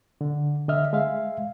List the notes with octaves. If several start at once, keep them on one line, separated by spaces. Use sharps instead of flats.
D3
D3 D#5 E5 F6
G#3 E5 F5